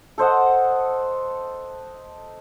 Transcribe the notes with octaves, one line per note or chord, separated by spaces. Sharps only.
A4 C5 D#5 F#5